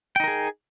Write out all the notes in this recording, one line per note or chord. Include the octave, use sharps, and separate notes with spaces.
D#4 G#4 A#4 G5